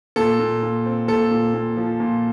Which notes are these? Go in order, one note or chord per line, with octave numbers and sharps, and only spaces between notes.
A#2 A4
A#2
A#2
C4
A#2 A4
A#2
A#2
F3
A#2